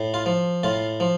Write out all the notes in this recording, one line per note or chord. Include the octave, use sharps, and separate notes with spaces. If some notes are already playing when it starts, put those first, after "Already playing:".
Already playing: A2
F4
F3
A2 F4
F3